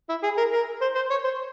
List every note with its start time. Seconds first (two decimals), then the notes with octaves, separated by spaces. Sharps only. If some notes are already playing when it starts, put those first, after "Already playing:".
0.09 E4
0.23 G#4
0.38 A#4
0.52 A#4
0.81 C5
0.95 C5
1.10 C#5
1.24 C5